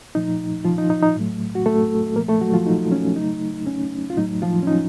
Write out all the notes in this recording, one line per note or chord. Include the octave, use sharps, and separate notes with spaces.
A#2 F3 A3 D#4
F3 F4
D#4
D#4
D#4
A2 F#3 A3
F#4
A3 A4
A#2 F3 A3 A#3 A#4
A3 A4
F#3 F#4
F3 F4
D#4
C#4
C#3 F#3 A3 D#4
C#4
F4
A2 F#3 A3 D#4
F3 F4
C#4
D#4